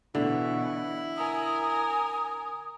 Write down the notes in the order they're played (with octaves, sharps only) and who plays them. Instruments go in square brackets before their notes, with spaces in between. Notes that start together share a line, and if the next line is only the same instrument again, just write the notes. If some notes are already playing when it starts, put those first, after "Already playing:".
[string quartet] B2 E3 [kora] D3 [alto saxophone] E4
[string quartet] A#4 G#5 [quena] D#6